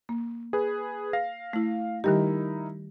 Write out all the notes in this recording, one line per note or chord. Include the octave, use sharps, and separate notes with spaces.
A#3
G#4 B4
F5 A#6
A3 E4
D#3 G3 D#4 E4 G4 A#4